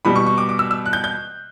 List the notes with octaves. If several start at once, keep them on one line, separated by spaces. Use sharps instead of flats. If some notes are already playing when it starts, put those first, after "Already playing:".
B2 G3 B5
C#6
C#6
D6
D6
E6
E6
F#6
G6
G6